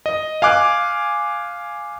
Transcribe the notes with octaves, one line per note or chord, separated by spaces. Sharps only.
D#5
F5 G#5 D6 F#6